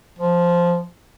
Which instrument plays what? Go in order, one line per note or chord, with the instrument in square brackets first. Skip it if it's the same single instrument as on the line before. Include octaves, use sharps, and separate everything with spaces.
[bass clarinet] F3